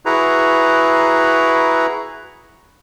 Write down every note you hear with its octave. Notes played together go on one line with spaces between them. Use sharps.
E4 F#4 G#4 B4 A#5